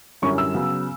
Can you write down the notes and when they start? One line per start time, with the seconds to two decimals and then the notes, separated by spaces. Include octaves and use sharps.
0.22 F#2 D3 G3 C#4 E4 C#6
0.38 E6
0.54 C#3 F#3 B3